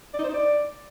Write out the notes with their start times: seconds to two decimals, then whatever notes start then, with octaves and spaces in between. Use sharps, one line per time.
0.14 D5
0.19 D#4
0.24 C5
0.29 D#4
0.34 D5